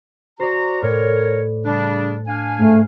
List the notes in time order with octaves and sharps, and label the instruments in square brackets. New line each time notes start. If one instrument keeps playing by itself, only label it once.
[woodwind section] F#4 A#5 [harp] C5 D5
[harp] A2 [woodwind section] A#4 C#5
[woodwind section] C#3 G3 D4
D4 F5 G#5
[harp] G#2 F6 C7 [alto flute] A3